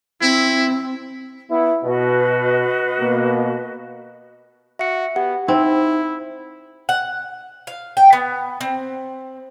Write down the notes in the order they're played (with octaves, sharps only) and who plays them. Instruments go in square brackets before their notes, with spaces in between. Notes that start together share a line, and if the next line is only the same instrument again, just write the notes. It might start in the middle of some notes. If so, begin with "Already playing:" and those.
[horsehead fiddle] C4 [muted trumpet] E4
[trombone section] B3 E4 [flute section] F#5
[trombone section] B2 [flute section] F#4 B4 D#5
[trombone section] B2 A#3
[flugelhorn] F#4 [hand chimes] E5 C#7
[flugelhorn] B3 [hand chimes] G4 F#5
[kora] C4 [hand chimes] D#4 [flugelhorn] E4
[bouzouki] F#5
F5
G5
B3
C4